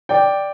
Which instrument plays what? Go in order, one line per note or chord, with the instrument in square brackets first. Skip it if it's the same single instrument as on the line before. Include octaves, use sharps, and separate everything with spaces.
[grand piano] D5 G5